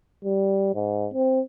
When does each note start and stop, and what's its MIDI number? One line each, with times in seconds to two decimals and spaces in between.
0.24 0.72 55
0.74 1.08 44
1.13 1.40 60